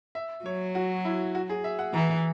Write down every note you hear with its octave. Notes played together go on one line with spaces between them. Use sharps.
E5
F#3 C#5
F#4
E4
F#4
G#4
E5
F#5
E3 A#5